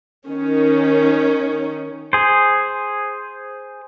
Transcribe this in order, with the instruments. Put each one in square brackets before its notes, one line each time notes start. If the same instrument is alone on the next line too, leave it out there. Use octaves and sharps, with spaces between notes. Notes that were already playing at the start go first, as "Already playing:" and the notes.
[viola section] D#3 C#4
[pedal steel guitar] G#4 C5